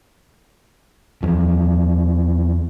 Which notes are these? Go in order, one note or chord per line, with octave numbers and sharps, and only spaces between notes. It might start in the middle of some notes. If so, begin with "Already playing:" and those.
E2 F3